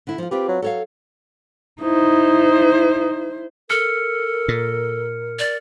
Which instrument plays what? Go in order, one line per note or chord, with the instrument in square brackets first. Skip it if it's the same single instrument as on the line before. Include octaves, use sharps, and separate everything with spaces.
[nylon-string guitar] D3 E4
F3 F4
[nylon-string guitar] C4 F4 B4 [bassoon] G4
[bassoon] F#3
[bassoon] F#3 [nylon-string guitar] A4 C#5 F5
[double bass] D#4 [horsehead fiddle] E4 C5
[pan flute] A4 [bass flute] A#4 [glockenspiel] F6 C#7
[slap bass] A#2
[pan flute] D5